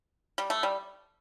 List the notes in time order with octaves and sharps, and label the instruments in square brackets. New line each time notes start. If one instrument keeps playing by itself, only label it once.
[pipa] G3
A3
G3